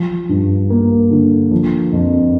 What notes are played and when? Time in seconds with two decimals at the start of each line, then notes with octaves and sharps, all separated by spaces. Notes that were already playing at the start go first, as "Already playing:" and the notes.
Already playing: F3
0.29 G2
0.70 A#3
1.10 D3
1.51 F3
1.93 F2